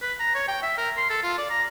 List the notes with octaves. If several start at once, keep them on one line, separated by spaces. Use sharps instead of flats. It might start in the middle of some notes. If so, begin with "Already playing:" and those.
B4
A#5
C#5
G5
E5
A#4
C6
A4
F4
D5
A#5